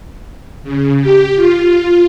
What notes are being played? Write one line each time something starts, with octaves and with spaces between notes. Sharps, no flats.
C#3
G4
F4